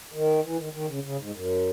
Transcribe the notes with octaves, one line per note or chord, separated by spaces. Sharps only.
D#3
E3
D#3
D#3
C#3
C#3
G#2
F#2